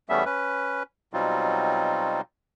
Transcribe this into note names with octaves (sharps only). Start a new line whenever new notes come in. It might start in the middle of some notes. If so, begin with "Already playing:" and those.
E2 G3 A3 B3 C#4 E5
C#4 B4
B2 F#3 G3 C4 D#4 F4